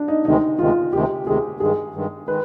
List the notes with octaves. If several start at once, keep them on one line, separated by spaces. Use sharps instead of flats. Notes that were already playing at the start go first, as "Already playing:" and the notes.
Already playing: D4
D#4
D2 C3 D#3 G#3 D#4
D2 C3 D#3 G#3 F4
D2 C3 D#3 G#3 G4
D2 C3 D#3 G#3 G#4
G2 D#3 G#3 G#4
G2 D#3 G#3
D#3 G#3 B4